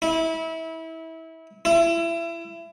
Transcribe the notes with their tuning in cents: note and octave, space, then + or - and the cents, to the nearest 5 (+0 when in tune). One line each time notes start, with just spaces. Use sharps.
E4 -25
E4 +30